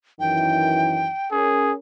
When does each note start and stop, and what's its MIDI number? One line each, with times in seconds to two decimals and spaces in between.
0.20 1.08 42
0.20 1.08 51
0.20 1.08 52
0.20 1.29 79
1.32 1.72 61
1.32 1.73 68
1.32 1.72 70